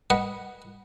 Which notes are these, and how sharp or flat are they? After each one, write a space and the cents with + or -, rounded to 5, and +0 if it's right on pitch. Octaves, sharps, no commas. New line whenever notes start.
B4 -10 D#5 -5 F#5 +0